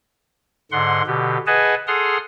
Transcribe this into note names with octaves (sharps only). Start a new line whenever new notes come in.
G#2 D3 F#5 C6
B2 D3 G4
G#4 B4 D#5 F#5 G#5 A5
G#4 A4 F#5 C6 D#6 F6